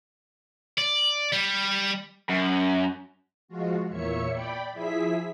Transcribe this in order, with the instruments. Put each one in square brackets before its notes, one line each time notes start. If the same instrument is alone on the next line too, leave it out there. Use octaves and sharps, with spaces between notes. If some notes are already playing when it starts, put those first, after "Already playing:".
[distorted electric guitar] D5
G3
[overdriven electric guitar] F#2
[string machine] F3 G#3 F4 F#4
E2 A#2 A#3 C#5 E5 C#7
D5 G5 B5
F3 E4 G#4 E5 B6